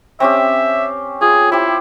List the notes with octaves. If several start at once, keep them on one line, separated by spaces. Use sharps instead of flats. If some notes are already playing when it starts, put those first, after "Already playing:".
C4 C#4 G4 E5
F4 G#4
E4 G4 C5